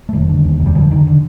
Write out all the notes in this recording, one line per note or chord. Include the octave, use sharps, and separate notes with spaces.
A3
F1 D#3 G3
D3
D#2
F1
G3
F1 D3 F3
D3 D#3
D3